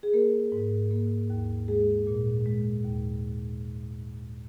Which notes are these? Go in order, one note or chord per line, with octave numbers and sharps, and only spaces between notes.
G#4
A#3 A#4
G#2
A#3
D#2
G#3 G#4
A#2
G#3
D#2